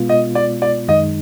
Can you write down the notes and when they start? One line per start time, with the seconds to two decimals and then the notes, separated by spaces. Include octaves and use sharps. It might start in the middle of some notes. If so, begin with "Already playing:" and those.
Already playing: B2 G#3 B3 F4
0.09 D#5
0.35 D5
0.62 D5
0.88 F#2 D#3 G#3 D#4 D#5